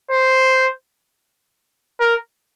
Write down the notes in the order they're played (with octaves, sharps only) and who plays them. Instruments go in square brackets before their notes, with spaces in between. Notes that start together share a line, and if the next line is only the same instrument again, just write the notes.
[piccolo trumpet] C5
A#4